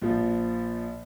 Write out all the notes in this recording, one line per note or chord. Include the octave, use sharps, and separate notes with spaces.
A#1 F3